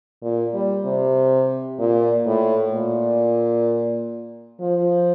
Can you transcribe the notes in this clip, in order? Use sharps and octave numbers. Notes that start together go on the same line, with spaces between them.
A#2
G3
C3
A#2
A2
A#2
F3